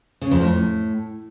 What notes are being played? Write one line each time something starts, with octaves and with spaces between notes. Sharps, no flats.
C#3
F2
A2